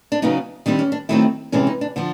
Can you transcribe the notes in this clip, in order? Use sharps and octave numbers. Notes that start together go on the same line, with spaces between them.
D4
C#3 F#3 B3 D#4
D#3 G3 C4 D4
C#4
D4
D#3 F#3 A3 C4 E4
C3 E3 G#3 C#4 D4
D#4
D4
D3 F3 D4